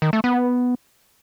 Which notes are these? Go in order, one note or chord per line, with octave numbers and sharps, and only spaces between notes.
D#3
A3
B3